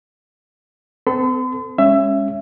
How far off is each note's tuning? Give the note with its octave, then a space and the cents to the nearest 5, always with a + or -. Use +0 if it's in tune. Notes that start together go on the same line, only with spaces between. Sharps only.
C4 -40 A4 +0 C6 -45
G#3 -25 C#4 +0 E5 +20